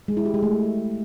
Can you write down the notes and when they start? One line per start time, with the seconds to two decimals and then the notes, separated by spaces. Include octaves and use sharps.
0.08 G#3
0.17 E4
0.25 G4
0.34 G#3
0.43 A3